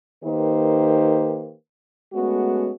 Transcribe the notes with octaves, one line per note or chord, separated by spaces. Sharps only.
D#3 A#3 D#4 G4 B4 C5
G#3 A3 B3 C#4 F#4